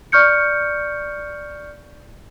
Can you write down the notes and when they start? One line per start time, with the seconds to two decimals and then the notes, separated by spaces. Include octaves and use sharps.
0.12 D5 C#6 F6 G6 C#7